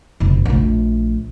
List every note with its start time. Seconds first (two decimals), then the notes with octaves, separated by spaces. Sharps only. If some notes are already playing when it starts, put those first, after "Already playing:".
0.20 F1 B2
0.45 A#1 A3